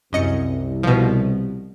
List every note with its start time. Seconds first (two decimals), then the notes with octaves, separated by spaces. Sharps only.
0.13 C2 F#2 D#5 C#7
0.83 B2 F3